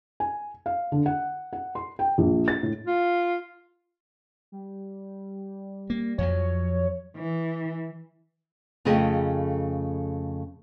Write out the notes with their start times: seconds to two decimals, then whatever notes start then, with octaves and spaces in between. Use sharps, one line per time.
0.20 G#5
0.66 F5
0.92 D3
1.06 F#5
1.53 F#5
1.75 C6
1.99 G5
2.18 A#1
2.48 A6
2.63 A2
2.86 F4
4.52 G3
5.90 A#3
6.18 F2 F3 F#3 C#5
7.17 E3
8.85 F2 C#3 A3 G#4 D#5 G5